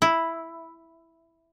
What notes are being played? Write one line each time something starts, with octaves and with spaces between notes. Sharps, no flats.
E4